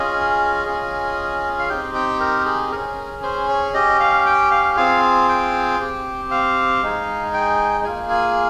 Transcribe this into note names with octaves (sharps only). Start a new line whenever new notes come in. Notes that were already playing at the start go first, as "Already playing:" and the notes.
Already playing: C#4 F4 G#4 D#5
C#4 F4 G#4
F5
C4 D#4 G4 G5
G5
A#4
G#4
C#4 G#4 A#4
C5
C#5
C#4 G4 D#5
F5
G5
F5
C4 F4 G#4 F5
G5
C4 G4
F5
G#3 D#4 G#4
G5
A#3 F4 G#4 G#5
G#5